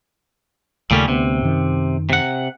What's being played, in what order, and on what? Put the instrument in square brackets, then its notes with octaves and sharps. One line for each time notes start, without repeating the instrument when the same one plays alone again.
[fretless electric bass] D#2 C#3 A3 [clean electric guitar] A#2 G3 C#4
[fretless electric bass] D2 B3 [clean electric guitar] C3
[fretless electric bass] F#2 D#3
[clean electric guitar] C3 F#5